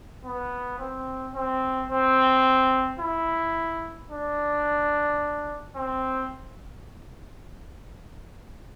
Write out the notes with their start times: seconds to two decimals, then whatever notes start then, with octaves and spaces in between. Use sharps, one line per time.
0.25 B3
0.79 C4
1.34 C4
1.90 C4
2.99 E4
4.10 D4
5.75 C4